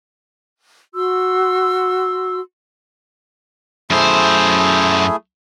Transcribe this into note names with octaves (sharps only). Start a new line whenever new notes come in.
F#4 C6 E6
F#2 A3 E4 G#4 C5